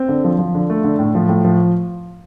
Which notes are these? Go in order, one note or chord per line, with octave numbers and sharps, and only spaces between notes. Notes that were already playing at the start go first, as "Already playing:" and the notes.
Already playing: C4
D3
F3
F3
D3
A3
D3
A2
F3
A2
F3